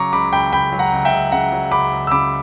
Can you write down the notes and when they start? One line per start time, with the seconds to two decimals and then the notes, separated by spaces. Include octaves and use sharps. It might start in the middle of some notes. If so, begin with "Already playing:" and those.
Already playing: C#3 F#3 A#5 C#6 D6
0.13 C#2 B5 D6
0.33 C#2 G5 B5
0.52 C#3 G5 B5
0.72 F#3
0.79 F#5 A#5
0.92 C#2
1.05 E5 G5
1.12 C#2
1.32 C#3 F#5 A#5
1.52 F#3
1.71 C#2 B5 D6
1.91 C#2
2.07 E6
2.11 C#3 B5 D6